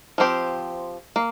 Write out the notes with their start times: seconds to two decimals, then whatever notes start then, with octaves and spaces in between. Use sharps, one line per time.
0.18 F3 C4 G4 C5
1.16 A#3